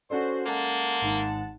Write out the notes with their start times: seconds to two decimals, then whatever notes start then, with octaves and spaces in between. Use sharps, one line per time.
0.10 C#4 F#4 A4 C5 D5
0.46 G#3 A#3 F#5 A5
1.02 G#1 G#2